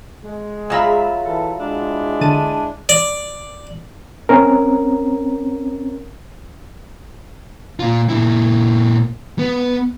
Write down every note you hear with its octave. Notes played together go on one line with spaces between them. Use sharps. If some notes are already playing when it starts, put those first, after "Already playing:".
G#3
F#3 F4 G#4 E5 A#5 B5
E3 A4
G#3 D4 E4
D3 A5 D#7
D5
C4 C#4 A#4
A#2 F4
A#2 E4
B3